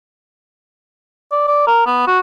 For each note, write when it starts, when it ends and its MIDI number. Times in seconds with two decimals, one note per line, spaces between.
1.32 1.48 74
1.48 1.64 74
1.67 1.81 70
1.86 2.03 59
2.07 2.19 66